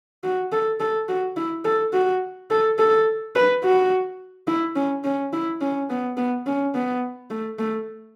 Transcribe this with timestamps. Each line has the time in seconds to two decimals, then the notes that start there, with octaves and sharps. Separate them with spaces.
0.24 F#4
0.52 A4
0.80 A4
1.09 F#4
1.36 E4
1.65 A4
1.93 F#4
2.50 A4
2.78 A4
3.35 B4
3.63 F#4
4.48 E4
4.76 C#4
5.04 C#4
5.33 E4
5.61 C#4
5.90 B3
6.17 B3
6.46 C#4
6.75 B3
7.31 A3
7.59 A3